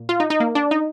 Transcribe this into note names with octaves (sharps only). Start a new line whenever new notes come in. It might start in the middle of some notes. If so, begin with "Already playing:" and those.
Already playing: A#2
F4
D#4
D#4
A#3
D4
D#4